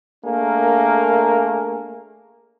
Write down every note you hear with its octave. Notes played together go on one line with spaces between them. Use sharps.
A3 A#3 D4 G#4 A#4